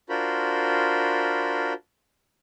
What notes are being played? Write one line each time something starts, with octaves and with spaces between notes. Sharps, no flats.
D4 F4 F#4 A#4 C5 B5